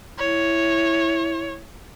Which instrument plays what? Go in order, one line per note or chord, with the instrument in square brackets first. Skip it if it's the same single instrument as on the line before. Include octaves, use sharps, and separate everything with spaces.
[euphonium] E4 [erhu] C#5